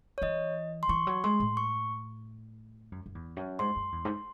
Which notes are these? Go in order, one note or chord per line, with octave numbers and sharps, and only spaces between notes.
C#5
E3 D#5
C6
E3 C#6
F#3
G#3 C6
A2
C#6
F#2
F#2
E2
F#2
G#2 C6
F#2
E2
G#2